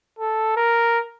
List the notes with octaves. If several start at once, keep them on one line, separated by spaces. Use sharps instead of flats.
A4
A#4